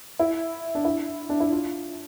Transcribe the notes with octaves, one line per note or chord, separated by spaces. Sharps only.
E4
D4
E4
D4
E4
F4